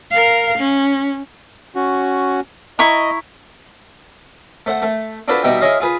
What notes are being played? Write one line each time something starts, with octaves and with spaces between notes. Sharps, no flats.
A#4 F5
C#4
C#4 F#4
E4 D#5 A#5 C#6
A3 C5 F#5
A3
D4 F4 F#4 A4 B4 C5
B2 G3 D#4 E5 G5
E4 G#4 C#5 D#5 F5
F4 G#4 B4